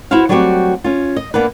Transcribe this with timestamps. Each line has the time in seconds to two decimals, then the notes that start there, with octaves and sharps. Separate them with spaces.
0.11 E4 F#4 B4 C5 F5
0.29 F#3 G3 A3 C4 F#4 G4
0.84 C#4 F4
1.16 D#5
1.34 A#3 B3 D4 B4